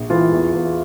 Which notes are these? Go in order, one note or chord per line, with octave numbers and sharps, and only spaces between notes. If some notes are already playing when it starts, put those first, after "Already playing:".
Already playing: A#1
E3 F4
E2
E2